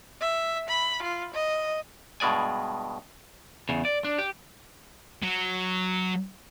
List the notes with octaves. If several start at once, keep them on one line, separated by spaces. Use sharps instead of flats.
E5
B5
F4
D#5
G2 B2 G#3 D5 G#5
E2 C#3
D5
D4
G4
F#3